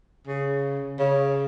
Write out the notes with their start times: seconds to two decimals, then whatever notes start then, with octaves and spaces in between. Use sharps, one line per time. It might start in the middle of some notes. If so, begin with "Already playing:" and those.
0.27 C#3
0.99 C#3